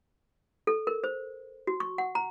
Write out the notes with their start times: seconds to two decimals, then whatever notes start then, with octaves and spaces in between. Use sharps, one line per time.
0.67 A4
0.87 A#4
1.04 C5
1.67 F#4
1.80 C#6
1.98 F#5
2.15 A#5